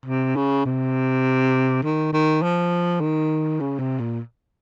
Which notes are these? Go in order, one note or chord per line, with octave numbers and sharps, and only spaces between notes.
C3
C#3
C3
D#3
D#3
F3
D#3
C#3
C3
A#2